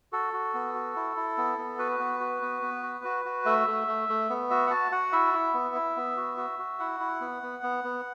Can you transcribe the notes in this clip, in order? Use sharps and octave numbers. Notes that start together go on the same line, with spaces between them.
F#4 A4
F#4
B3
F#4
E4
E4
B3
B3
F#4 B4
B3
F#4
B3
B3
F#4
F#4
F#4
A3 E5
A3
A3
A3
B3
F#4 E5
F#5
F#4 A5
F#4 F#5
E4 E5
E4
B3
E4
B3
F#4
F#4
F#4
E4 F#5
E4
B3
B3
B3
B3